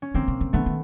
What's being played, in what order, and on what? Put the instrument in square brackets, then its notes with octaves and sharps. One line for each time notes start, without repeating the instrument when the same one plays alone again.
[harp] C#4
[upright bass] D3 [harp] A#3 C4
[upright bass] C#3
C#3
[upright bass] D3 [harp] A3 B3
[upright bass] D#3